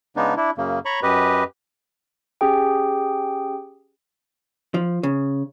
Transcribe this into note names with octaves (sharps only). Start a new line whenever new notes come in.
C#3 G#3 B3 D4 D#4
D4 E4
F#2 C#3 A#3
C#5 A#5 B5 C#6
F#2 G4 B4 D#5
C#4 G4 G#4 G5
F3
C#3